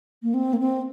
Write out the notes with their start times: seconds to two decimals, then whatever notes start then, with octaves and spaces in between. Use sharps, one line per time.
0.23 A#3
0.34 C4
0.53 A#3
0.60 C4